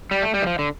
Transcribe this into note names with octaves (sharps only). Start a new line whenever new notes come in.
G3
A3
G3
E3
F3
D3